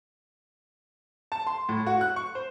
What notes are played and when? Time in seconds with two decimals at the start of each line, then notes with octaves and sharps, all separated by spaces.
1.32 A5
1.47 C6
1.69 A2
1.86 F#4
2.01 F#6
2.16 C#6
2.35 C5